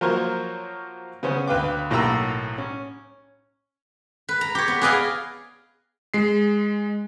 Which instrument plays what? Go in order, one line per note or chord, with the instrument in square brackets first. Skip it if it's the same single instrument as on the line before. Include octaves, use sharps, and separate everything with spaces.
[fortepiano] F3 F#3 A#3 A#4 C5 C#5
C#3 B3 C#4 C5
D2 B4 F5 G5 D6
B1 A2 A#3 G4 A#5 E6
C#4
[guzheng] B4
A#5
G4 C#5
B3
G#4 B4 D5 D#5 F5 G#5
[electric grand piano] G#3 C7